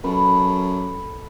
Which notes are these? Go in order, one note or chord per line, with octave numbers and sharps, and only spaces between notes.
F#2 A4 B4